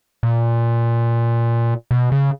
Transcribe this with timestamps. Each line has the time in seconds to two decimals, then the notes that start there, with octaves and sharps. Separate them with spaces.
0.23 A#2
1.91 B2
2.12 C#3